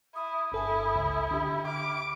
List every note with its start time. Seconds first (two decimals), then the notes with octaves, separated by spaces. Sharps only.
0.15 E4 D#6
0.52 G1 E4 A4 G#5
0.96 C#2
1.31 D3 G4 G5
1.68 B5 D6 F6